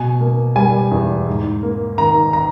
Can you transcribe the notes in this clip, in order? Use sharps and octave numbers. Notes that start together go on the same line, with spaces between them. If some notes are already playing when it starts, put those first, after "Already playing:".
Already playing: B2 G#5
A#3
G3 G#5
E2
G#2
A#3
D#3 A#5
A#5